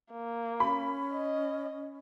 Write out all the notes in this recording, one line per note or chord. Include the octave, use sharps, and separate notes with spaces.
A#3
C#4 B5
D#5